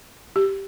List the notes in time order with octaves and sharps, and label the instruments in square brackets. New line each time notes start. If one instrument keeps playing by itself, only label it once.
[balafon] G4